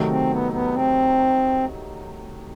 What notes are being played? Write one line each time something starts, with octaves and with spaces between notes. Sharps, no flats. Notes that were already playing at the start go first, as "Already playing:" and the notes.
Already playing: C3 D#3 F#3 A3 D#4
C4
B3
B3
C4